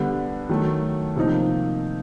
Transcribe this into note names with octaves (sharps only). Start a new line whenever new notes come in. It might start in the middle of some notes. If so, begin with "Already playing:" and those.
Already playing: D3 G3 B3
D#3 F#3 A3
C3 F3 A#3 D#4